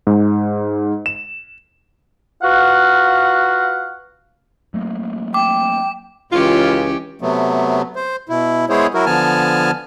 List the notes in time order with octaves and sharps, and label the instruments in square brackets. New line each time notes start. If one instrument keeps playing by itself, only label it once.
[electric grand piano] G#2
E7
[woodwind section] F4 F#4 B4 F5 F#5
[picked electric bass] F#3 A3 A#3
[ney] G5 [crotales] D6
[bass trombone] C#2 [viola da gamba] E3 C#4 G4 [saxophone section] F4
[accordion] C3 F#3 A3 B3
C5
B2 E4
G#3 B3 E4 G#4 C5 C#5
F#3 E4 F#4 A#4
D3 F3 B3 G#5 A5 F6